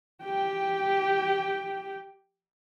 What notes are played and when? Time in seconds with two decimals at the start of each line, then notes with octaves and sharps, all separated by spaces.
0.24 G4 G5